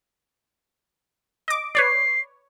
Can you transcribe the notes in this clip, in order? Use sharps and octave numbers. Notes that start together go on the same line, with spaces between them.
D#5 D6
B4 C#5 D5 C7